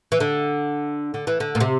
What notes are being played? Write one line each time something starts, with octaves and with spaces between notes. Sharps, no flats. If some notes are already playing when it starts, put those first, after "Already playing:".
E3
D3
D3
E3
D3
A#2
C3